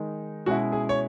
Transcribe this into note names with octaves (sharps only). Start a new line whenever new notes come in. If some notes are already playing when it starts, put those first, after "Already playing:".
Already playing: D#3 G#3 D#4
B2 G#3 C#4 E4 F#4
G#4
C#5